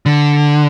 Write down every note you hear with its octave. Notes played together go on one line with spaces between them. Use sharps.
D3